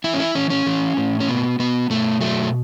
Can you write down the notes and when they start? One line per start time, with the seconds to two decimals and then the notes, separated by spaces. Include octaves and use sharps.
0.04 E3 E4
0.14 C#4
0.20 E4
0.35 E3 C#4
0.50 C#4
0.66 E3
0.97 A2
1.20 C#4
1.28 B2 B3
1.59 B2 B3
1.90 B2 A3
2.21 F#3 A3